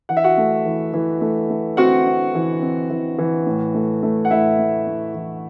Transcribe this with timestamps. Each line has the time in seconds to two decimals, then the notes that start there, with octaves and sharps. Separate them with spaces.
0.09 E3 F#5
0.17 E5
0.24 F#4 F#5
0.38 A3
0.65 E3
0.93 E3
1.21 A3
1.50 A3
1.77 C4 F#4 F#5
2.06 C4
2.35 E3
2.62 C4
2.90 E3
3.18 E3
3.46 A2
3.74 A3
4.03 A3
4.25 F#5
4.31 A2 E4 E5
4.59 A2
4.87 A2
5.14 E3